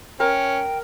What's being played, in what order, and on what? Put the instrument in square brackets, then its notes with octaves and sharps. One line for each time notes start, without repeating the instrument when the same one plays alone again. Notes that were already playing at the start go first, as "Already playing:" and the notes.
[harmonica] C#4 [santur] A#4 [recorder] G5